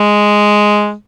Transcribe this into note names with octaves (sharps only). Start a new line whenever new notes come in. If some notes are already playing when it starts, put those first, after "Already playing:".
Already playing: G#3